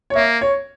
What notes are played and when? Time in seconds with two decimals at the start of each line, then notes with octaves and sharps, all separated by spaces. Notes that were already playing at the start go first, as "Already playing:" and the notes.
0.10 C#5
0.15 A#3 E5
0.41 C#5